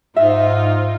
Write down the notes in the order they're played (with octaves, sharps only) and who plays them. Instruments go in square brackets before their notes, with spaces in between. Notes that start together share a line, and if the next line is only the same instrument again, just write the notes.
[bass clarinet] G#2 [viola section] D#4 F4 [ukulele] E5